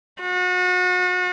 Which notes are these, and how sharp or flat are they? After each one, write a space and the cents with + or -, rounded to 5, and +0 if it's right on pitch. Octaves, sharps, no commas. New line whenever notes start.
F#4 -35